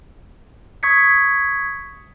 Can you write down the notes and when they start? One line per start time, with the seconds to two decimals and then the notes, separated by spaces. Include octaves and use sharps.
0.83 C#6 D#6 G#6 B6 C#7